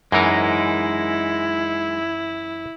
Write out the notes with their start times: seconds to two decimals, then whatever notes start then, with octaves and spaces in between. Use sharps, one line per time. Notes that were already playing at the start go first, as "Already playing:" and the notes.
0.12 F#2 E3 G#3 D#4 E4 A#4